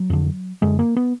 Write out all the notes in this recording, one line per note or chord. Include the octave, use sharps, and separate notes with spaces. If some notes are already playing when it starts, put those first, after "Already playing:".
Already playing: F#3
F2 D3
F#2 D3 G#3
A#3
B3